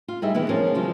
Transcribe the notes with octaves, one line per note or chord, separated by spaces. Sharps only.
F4
G3 D#4 E4 G#4 D#5 E5
D#3 E3 B3 E4
F3 C#4 F4 G#4 A#4
C#3 F3 F#3 G#3